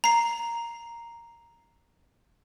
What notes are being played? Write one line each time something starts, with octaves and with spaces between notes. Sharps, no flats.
A#5 C7